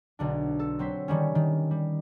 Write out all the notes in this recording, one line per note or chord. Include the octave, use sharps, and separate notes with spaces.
B1 D3 D4
A4
F#3 C4 C6 B6
D3 D#3 G3 C#4
D#3
G3